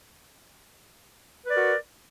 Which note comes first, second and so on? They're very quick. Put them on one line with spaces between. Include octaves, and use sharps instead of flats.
B4 D5 A#4 F#4